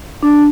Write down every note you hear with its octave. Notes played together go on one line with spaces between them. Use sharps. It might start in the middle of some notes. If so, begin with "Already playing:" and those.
D4